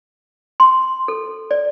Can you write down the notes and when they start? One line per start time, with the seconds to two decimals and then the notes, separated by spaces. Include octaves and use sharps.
0.60 C6
1.08 A4
1.51 D5